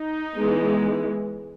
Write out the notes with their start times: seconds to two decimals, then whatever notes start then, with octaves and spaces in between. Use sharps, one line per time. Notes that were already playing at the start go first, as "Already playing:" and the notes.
Already playing: D#4
0.36 E3 G#3 B3